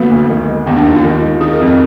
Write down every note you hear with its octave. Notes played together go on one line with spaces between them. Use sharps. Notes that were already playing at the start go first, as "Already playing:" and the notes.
Already playing: D3 F#3 A#3 B3
D2
D#3
G#3
D#2 B3
D4
D#2 D#4
F4
D#3
G#3
D#4 G#4
A#4
F2
A#4